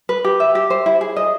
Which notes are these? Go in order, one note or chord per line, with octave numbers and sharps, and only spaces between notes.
B4
G4
E5
G4
C5
E4
G#4
D#5